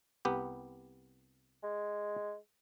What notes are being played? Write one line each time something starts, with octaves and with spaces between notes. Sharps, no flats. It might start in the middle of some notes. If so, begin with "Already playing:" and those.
C2 B3 G4
G#3